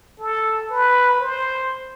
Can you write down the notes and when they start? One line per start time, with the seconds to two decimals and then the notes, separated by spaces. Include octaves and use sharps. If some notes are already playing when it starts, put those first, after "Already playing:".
0.19 A4
0.70 B4
1.20 C5